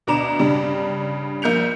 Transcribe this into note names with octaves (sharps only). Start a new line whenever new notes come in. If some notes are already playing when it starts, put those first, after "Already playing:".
D2 B2 D4 A#5 D6 E7
G2 C#3 G3 D4
A#1 A#3 G6 C#7 F7